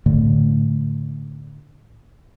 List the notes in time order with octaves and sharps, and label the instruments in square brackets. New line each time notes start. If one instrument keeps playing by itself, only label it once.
[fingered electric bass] A2 D3 A3